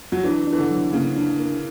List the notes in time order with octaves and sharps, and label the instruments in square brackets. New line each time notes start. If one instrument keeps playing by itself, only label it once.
[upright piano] F#3
[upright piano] E3 [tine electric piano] D4
[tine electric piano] D4
[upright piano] E3
D3
[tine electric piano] F#3
[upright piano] C#3 [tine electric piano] A#3
[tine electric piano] D4
A#4